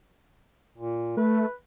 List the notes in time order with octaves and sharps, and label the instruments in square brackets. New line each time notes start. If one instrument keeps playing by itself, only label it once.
[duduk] A#2
[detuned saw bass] A3 [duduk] B4